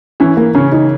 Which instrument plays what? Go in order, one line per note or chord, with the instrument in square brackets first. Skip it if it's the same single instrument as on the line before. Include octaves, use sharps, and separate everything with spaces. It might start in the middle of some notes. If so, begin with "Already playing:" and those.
[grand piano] E3 [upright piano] C#4
[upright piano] A#3
[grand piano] C#3 [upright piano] C#4
[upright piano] D#4